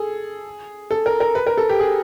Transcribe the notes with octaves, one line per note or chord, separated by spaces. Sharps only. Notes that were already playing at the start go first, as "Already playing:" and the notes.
Already playing: G#4 A4
A4
A#4
A#4
B4
A#4
A4
G4
G#4